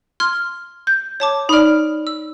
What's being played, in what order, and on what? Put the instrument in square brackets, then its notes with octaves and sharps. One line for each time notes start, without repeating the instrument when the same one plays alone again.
[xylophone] C6 F6 G#6
[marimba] G6
[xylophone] C#5 A5 D6
[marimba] D#4 D5 [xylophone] B5 F6
[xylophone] E6